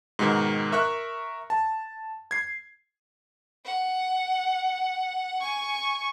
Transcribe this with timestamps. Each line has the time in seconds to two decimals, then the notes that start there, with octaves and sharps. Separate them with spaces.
0.19 G#2 B2 D#3
0.72 A#4 E5 C#6 F#6
1.50 A5
2.31 G#6 C7
3.65 F#5
5.40 G#5 C#6